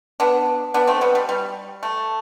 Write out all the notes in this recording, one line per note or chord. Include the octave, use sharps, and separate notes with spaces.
B3 D4
B3 D4
A3 C4
G3 B3
G3
G3
A3